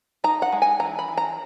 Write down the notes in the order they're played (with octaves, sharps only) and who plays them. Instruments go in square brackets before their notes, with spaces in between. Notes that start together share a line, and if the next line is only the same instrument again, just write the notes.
[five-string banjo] D#4 A#5
F#5
G#3
G#5
E3 A#5
B5
E3
A#5